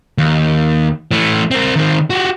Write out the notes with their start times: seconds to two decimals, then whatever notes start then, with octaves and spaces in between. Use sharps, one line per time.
0.18 D#2
1.11 E3 A3
1.51 C4 A#4
1.76 D#3 C4
2.10 F#4 G4